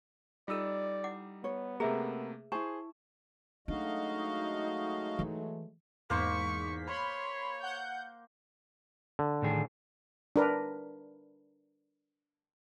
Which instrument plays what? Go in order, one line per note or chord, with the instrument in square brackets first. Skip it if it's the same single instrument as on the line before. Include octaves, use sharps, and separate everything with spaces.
[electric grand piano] G3 D#4 E6 [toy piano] F4 A4 [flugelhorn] D5
[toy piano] E4 F#5 D6
[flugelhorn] B3 [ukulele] C#5
[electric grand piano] C3 A3 A#3 [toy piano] G#4 B4 E5 [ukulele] A#4
[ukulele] E4 A5 [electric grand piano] G#4 C5 [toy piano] C#6
[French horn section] F#3 G#3 A3 [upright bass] D4 [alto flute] D#4 [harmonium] F#4 D#5 F5
[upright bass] E3
[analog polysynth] E2 G#2 B6 [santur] A#3 C5 [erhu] C#6
[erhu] C#5 [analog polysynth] B5 C6
[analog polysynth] F#5 G6
[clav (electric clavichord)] D3
[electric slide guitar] A2 D#3 G#4
[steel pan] D4 A#4 B4